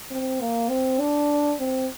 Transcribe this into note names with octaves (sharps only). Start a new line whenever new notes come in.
C4
A#3
C4
D4
C4